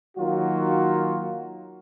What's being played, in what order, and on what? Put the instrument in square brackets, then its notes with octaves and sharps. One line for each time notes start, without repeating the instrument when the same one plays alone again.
[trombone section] D#3 F#3 A#3 F4 F#4